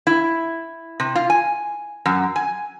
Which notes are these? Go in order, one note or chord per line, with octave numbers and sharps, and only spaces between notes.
E4
C3
F4
G#5
F#2
G#5